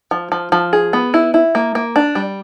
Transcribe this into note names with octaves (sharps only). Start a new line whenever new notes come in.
F3
F3
F3
G#4
B3
E4
E4
A#3
A#3
D4
G3